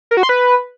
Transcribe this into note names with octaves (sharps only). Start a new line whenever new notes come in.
A#4
F#4
C6
B4